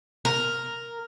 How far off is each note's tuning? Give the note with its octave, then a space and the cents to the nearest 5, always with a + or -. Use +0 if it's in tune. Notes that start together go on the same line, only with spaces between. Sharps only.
A#4 +0